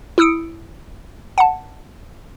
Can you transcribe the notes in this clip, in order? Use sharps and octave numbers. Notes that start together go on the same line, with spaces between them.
E4 D#6 E6 C#7 D7
F#5 A5